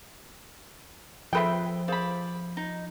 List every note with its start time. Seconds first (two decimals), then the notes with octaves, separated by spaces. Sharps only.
1.33 F3 C4 G#4 A4 B4 E5 G5
1.88 G#4 C5 D5 F5 B5
2.57 D#4